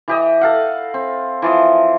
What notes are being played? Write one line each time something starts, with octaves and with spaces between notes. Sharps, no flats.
E3 G4 D#5
A4 F5 F#5
C4
E3 F3 D#5